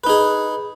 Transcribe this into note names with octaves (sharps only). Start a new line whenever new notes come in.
D#4 G#4 B4